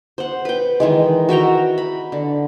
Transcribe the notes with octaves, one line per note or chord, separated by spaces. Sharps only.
C5 F#5
B4 G5
D#3 E3 G#3
F#4 E5 G5 A#5
B5
D3